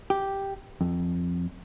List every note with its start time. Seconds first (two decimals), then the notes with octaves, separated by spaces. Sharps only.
0.10 G4
0.81 F2